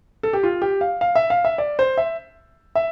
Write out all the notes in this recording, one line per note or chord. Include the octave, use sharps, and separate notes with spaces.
A4
G4
F4
G4
F5
F5
E5
F5
E5
D5
C5
E5
E5